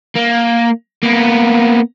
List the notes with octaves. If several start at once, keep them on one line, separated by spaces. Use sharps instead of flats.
A#3
A#3 B3